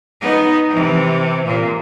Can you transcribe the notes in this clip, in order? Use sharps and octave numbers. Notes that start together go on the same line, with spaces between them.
B3 D#4
C3 E3
A#2